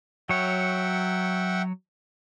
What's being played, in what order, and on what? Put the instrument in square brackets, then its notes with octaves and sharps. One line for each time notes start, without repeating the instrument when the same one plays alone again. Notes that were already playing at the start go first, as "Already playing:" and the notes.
[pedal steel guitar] F#3 C#5 [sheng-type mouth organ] E5 F#5 G5